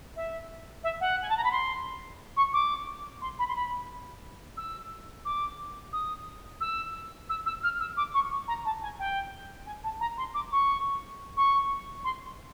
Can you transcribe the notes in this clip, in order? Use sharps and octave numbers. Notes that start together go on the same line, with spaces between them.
E5
E5
F#5
G#5
A5
A#5
B5
C6
C#6
D6
C6
B5
C6
B5
E6
D6
D#6
E6
E6
E6
F6
E6
D6
C#6
A#5
A5
G#5
G5
G#5
A5
A#5
C6
D6
C#6
C#6
C6